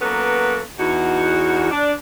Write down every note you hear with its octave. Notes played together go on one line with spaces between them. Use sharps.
F#3 A#3 B3 C#4 A4 B4
E2 D#4 F#4
D4